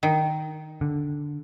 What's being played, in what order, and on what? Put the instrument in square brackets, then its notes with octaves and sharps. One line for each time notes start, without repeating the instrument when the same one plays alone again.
[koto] D#3
[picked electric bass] D3